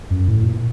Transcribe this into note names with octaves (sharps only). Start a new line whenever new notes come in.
F#2
A2
A#2